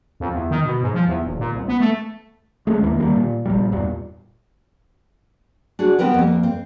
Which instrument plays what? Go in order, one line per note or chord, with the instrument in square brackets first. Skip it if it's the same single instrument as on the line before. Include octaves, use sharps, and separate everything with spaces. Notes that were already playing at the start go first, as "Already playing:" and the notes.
[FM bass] F2
E2
D#3
B2
G#2
F3
E2
D#1
A#2
C2
B3
A3
[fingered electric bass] G#3 A3 C#4
D#2 E3 G#3 A#3
D#3 G3 A3 A#3
A#2
A#1 A#2 G3
E2 G2 A#2
[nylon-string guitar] D4 F#4 G#4
B3 C4 G4 A#4 B4
F2 A#3
C4